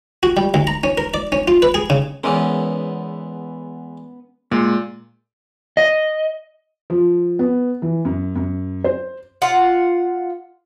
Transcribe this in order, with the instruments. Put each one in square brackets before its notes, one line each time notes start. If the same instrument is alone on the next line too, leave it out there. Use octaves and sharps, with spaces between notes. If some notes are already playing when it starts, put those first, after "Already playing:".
[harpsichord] F#4
G3
D2
A#5
C#4
A#4
D5
C#4
F4
B4
G#4
C#3
[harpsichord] E2 E3 G#3 [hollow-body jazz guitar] B3 C#4 A#4
[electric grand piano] A#2 [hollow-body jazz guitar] G#3
[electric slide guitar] D#5
[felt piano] F3
B3
E3
F#2
F#2
C5
[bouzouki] F4 F#5